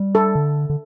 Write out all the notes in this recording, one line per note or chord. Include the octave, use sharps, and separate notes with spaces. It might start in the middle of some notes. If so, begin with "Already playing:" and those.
Already playing: G3
A4
D3
D3